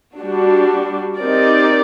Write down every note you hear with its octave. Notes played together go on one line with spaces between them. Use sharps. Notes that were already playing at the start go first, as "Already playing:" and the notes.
G3 D4 F#4
C4 D#4 G4 A#4 D5